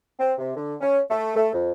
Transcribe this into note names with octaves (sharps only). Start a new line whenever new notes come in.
C4
C3
D3
C#4
A3
A3
F2